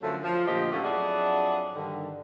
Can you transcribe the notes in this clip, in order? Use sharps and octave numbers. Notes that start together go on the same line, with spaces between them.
F#2 D3 F3 F#3 A3
F3
D2 A#2 F3 G4 D#5
A2 F#3 A3 A#3 C#4 E4
F2 F#3 D4 E4 G#4 F#5
G2 D3 D#3